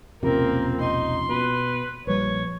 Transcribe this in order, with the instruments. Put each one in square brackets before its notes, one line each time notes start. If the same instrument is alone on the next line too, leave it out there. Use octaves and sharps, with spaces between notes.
[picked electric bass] E1 A#1 C3 [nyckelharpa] A#3 C4 [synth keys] C#4 F4 [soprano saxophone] A#4
[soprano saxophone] D#4 [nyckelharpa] C6
[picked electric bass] B2 [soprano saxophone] B4
[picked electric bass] A#1 [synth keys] F3 G3 B4 [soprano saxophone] C#5